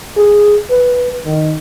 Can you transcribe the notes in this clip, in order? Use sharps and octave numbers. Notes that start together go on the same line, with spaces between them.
G#4
B4
D#3